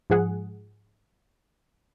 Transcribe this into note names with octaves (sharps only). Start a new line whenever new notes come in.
G#2 F3 G#4 F#5